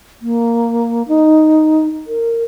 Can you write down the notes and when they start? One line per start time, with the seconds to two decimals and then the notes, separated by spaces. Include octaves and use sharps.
0.22 A#3
1.08 D#4
2.07 A#4